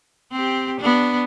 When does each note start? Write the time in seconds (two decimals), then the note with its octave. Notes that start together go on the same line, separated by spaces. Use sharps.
0.32 C4 G4
0.80 B3 D4